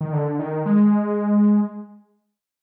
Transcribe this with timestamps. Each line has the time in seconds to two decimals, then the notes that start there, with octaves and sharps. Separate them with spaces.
0.01 D#3
0.13 D3
0.39 D#3
0.66 G#3